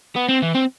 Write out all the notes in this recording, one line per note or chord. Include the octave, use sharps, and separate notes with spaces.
B3
C4
E3
C4